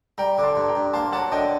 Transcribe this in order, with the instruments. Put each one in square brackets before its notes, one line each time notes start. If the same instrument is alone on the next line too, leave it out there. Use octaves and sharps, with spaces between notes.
[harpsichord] G3 [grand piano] G5 A#5
[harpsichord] D3 [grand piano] D6
[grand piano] A5 C6
[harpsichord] G2
[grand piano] G5 A#5
[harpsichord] G2
[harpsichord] A#3 [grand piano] A5 C6
[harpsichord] F#3 [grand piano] F#5 A5
[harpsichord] D3 [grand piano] D#5 G5